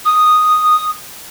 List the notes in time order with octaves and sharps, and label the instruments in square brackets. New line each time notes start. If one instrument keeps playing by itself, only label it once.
[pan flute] D#6